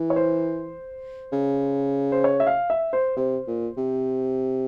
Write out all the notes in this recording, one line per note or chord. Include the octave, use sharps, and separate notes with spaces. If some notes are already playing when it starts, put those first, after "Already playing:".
Already playing: E3
C#5
C5
C#3
C5
C#5
E5
F5
E5
C5
C3 C5
A#2
C3